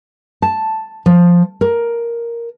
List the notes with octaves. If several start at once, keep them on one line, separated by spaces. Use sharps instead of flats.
A5
F3
A#4